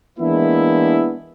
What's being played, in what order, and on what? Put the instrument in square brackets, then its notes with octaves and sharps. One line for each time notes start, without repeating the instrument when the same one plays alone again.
[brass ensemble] E3 G#3 A#3 B3 D4 E4